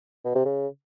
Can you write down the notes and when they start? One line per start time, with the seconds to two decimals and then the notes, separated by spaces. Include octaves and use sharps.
0.25 B2
0.35 C3
0.45 C#3